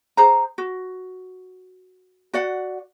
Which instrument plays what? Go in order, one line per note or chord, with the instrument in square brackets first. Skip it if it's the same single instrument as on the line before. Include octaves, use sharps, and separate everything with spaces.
[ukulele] G#4 C5 A#5
F#4
F#4 D5 F#5